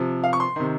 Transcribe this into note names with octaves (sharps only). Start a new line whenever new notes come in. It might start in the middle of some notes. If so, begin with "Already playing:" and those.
Already playing: C3 F3
F5
C#6
C6
C3 D#3